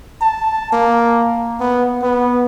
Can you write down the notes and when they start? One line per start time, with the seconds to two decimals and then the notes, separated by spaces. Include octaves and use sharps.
0.21 A5
0.72 A#3
1.60 B3
2.03 B3